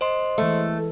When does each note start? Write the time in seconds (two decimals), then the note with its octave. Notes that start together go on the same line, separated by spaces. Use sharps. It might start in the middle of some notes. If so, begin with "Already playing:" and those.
0.01 C5 D#5 C6
0.38 E3 G#3 A3